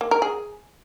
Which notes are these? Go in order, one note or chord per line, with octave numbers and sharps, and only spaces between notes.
A#3
A#4
G#4